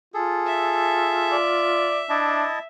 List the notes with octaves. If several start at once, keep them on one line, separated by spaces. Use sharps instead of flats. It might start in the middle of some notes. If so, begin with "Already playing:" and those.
F4 G#4 A4
E5
D5
D4 E4 D#5 A5